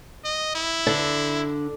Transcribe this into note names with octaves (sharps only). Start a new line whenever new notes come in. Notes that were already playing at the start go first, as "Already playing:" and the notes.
D#5
E4
D3